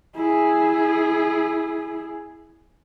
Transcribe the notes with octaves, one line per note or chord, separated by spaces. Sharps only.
E4 G#4